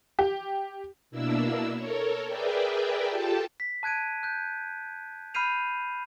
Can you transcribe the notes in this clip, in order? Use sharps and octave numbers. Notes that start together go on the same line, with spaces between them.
G4
B2 A#3 D4 E4 E6
A4 A#4 C#5
G#4 A#4 B4 D5 E5 G5
F4 G4 A4 G5 A5
B6
A5 F#6 G#6 D7 D#7
F#6 G6
B5 F6 G6 C7 D#7 F7